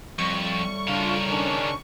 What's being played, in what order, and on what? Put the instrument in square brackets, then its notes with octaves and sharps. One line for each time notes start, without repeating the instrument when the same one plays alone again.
[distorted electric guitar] F2 [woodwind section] A2 G3 [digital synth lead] C#6
[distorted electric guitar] C#3 A#4 [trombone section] D4 F4
[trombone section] D#3 C#4 D4